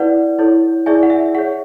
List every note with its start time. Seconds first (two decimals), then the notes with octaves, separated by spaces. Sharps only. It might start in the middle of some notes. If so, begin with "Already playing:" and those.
Already playing: E4 B4 D5 F#5
0.39 E4 A4 C#5
0.86 E4 G#4 D5 E5 G#5
1.03 F#5
1.10 E5
1.35 G#4 C#5 F#5